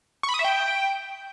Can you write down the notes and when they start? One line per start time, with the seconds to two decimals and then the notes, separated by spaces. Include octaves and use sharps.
0.23 C#6
0.29 B5
0.34 D#6
0.39 E5
0.45 G5